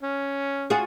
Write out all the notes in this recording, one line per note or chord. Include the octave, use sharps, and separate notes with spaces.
C#4
F4 F#4 G#4